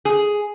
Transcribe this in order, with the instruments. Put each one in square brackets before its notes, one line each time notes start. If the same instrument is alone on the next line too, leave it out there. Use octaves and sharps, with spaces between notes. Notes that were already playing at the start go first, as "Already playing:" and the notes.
[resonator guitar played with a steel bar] G#4